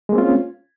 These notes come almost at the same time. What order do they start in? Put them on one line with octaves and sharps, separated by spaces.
G#3 A#3 C4 F4 C#4